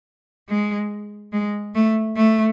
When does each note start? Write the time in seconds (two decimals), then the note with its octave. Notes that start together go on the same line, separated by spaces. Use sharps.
0.49 G#3
1.33 G#3
1.74 A3
2.16 A3